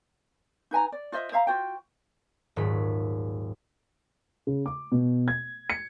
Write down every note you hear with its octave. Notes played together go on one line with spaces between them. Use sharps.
D#4 B4 G#5 A#5
D5
F4 C5 D#5 E5
C5 E5 F5 A#5
F4 F#4 C5 G5
D#1 G#2 F#3 G#4 B6
C#3
D6
B2
G#6
C#7